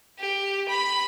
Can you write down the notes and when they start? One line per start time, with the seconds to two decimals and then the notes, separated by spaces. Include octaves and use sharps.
0.19 G4
0.69 B5